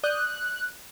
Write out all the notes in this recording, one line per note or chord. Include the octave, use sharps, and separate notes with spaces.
D5 D#6 F#6 G6